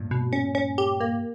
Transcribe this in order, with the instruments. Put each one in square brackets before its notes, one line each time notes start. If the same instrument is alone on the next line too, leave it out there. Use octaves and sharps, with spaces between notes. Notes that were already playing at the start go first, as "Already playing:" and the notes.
Already playing: [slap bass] G2 A#2
[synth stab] B2
C#4
C#4
G4
A#3